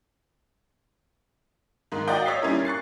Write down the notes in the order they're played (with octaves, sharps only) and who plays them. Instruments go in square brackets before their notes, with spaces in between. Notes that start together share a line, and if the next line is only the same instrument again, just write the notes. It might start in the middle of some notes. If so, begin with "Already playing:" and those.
[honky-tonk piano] G#2 D#3
F4 F#4 D5 D#5 G5
C#5 D#5 E6 A6 B6 C7
A#2 G3 C#4 D#4 E4 A#4
C#6 F#6 A6 C7